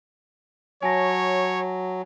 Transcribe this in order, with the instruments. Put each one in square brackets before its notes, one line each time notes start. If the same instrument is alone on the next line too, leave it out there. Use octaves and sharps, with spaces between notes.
[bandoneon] F#3 [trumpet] C#5 [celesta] G#5 A5 A#6